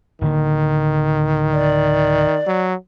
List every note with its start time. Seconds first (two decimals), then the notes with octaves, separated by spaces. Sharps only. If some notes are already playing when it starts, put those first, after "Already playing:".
0.21 D1 D3 D#3 A#3
1.53 D5
2.47 F#3